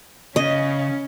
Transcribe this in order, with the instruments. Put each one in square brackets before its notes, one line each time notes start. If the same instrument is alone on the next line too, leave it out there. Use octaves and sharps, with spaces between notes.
[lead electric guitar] C#3 [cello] C#4 [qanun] D#5